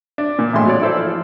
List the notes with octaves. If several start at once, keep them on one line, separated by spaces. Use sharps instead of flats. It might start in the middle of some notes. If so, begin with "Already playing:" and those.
D4
A#2
G#1 A2 G#3 E4 C6
F#3 C#5 D5
E4 A4 C5 D5
F3